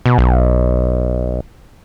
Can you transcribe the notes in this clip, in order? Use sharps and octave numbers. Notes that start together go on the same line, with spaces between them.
B2
B1